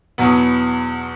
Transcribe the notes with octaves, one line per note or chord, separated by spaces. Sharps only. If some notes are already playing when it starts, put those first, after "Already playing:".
E2 B2 F#3 B3